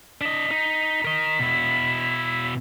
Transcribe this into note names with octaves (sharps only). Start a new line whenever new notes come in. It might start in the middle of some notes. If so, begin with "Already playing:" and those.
D4 D#5 B6
D#4
A#4 D#5
B2 E4